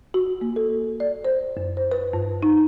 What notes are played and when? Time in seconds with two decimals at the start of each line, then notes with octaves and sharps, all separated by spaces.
0.14 F#4
0.41 A#3
0.56 A4
1.00 D5
1.25 C5
1.57 F#2
1.77 C5
1.92 B4
2.13 G2
2.43 D#4